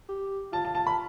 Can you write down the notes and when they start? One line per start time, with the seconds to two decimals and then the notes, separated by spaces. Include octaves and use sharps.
0.09 G4
0.53 F4 A5
0.65 A5
0.75 A5
0.87 B5